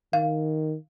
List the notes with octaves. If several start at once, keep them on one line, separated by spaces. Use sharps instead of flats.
D#3 F5